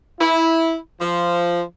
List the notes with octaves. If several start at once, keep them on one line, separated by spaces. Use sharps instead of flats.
E4
F3